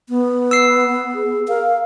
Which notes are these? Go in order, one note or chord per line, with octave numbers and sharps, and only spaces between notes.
B3
E6 C7
G#4
A#4 F5